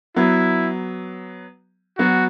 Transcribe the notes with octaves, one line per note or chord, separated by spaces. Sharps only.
F#3 B3 E4
F#3 B3 F#4